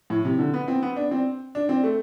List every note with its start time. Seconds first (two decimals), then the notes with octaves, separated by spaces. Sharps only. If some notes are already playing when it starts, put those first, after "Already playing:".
0.10 A2
0.25 C3
0.39 D3
0.54 B3
0.68 C4
0.83 B3
0.96 D4
1.11 C4
1.55 D4
1.69 C4
1.84 A3